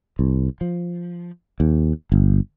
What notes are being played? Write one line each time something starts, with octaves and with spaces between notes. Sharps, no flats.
C2
F3
D#2
G1